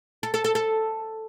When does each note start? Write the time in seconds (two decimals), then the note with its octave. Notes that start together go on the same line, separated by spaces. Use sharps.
0.23 A4
0.34 A4
0.44 A4
0.55 A4